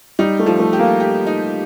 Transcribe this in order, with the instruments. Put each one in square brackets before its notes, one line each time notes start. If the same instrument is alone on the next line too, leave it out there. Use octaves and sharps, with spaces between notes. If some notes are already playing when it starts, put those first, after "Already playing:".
[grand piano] G3 [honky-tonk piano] D#4
[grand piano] A3
[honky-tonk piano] F3
[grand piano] A3
[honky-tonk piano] G4
[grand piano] A#3
[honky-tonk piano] G4
D#4